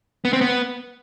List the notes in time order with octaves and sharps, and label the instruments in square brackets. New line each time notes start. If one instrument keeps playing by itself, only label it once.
[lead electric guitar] B3
C4
B3